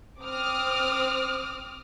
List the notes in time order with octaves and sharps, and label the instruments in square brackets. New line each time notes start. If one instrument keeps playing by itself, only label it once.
[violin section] C4 D6 D#6 F6